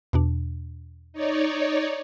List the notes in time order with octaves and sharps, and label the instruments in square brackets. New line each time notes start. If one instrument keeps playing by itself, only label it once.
[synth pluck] E2 B2 D4
[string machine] D#4 C#5 D5